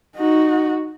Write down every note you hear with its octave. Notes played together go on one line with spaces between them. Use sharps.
D#4 F#4